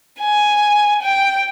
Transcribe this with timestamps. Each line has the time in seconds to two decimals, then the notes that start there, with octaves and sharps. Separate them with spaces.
0.20 G#5
1.02 G5